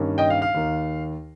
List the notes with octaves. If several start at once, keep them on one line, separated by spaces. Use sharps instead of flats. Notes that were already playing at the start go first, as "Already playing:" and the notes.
Already playing: G2 D#3 A#3 C#4
D#5 G5
F5
F5
D#2 D#3 A#3